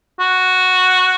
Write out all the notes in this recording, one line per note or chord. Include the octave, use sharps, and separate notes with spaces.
F#4